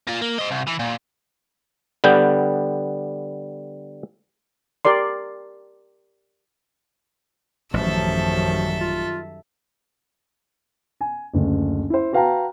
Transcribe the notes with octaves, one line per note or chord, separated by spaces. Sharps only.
A#3 F4
A#3
C5 D#5
C2
E3
A#2
D3 G3 B3 G5
G4 A#4 D5 C6
A1 F#2 D#3 F3 G3 A4 E5
F4
G#5
F#1 D2
E4 C5
F#4 B4 F5 G5 A5 A#5